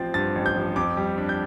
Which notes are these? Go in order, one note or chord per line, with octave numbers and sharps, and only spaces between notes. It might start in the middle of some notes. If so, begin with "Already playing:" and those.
Already playing: A1 F3 C4 A6
G2 A6
A1
G6
F3
F2 D6
G3
D4
G6